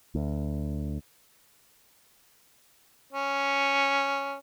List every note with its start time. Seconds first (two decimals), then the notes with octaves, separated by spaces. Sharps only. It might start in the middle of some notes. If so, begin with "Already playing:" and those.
0.15 D2
3.13 C#4